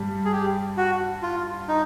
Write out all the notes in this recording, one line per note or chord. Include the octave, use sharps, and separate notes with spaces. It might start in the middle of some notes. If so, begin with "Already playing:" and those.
Already playing: G2 G3
G#4
G4
F#4
F4
D#4